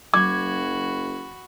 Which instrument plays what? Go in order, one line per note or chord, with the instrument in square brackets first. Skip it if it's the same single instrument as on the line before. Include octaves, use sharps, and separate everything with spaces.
[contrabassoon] F#1 [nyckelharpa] F#4 B5 [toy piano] D6 [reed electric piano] G#6